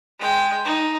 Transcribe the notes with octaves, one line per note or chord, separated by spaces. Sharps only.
G#3 G5
D#4